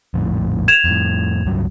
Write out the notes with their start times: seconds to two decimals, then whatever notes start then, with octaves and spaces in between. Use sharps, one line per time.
0.14 A#1 F2 A2
0.68 G#6 E7 F7
0.84 F2 A2
1.46 C#2 G2 F#3